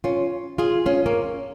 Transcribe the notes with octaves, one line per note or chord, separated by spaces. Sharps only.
C#4 F4
F4 G#4
C#4 F4
A#3 C#4